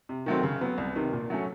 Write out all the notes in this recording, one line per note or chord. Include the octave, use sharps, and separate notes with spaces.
C3
D#3 F#3 A3 C4
C#3
F#3 B3
C2
C3 D#3
A#2
F#3 A3 C#4